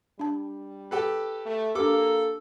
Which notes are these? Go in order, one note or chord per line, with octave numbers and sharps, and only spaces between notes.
G3 D4 A5
G4 A4 B4
A3
A#3 D4 G4 A4 D6